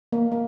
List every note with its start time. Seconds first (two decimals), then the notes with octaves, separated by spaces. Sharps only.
0.12 A#3
0.32 A#3